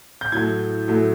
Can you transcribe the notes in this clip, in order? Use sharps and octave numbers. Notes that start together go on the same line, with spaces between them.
G6
A2 F#3 A3 G#6
A2 F#3 A3